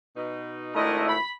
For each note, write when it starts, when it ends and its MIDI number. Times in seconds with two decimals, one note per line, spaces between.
0.16 0.73 47
0.16 0.73 63
0.74 1.13 32
0.74 1.13 57
0.74 1.07 62
0.74 1.13 64
0.74 1.07 70
0.74 1.07 75
1.08 1.30 83